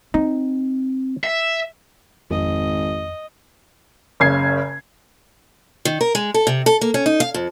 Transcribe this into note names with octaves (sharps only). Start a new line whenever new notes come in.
C4 D#4
E5
G#1 F2 D#5
F#1 C#3 G#6 C7
D#3
A#4
G#3
A4
C3
A4
A#3
C#4
D#4
F5
F2